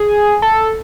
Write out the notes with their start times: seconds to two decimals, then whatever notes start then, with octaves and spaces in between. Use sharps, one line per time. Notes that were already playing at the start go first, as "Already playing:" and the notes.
Already playing: G#4
0.42 A4